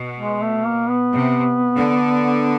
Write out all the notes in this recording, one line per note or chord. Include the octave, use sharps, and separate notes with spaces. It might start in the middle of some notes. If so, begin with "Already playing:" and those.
Already playing: B2
G#3
A3
A#3
B3
C3
D3